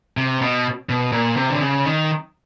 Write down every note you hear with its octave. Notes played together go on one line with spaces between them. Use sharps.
C3
B2
B2
A#2
C3
D3
C#3
D#3